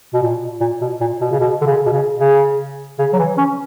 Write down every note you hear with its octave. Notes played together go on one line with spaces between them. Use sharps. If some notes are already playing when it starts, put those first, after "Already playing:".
B2
A#2
A#2
B2
A#2
B2
C#3
B2
D3
C#3
B2
C#3
C#3
C#3
F#3
E3
C#4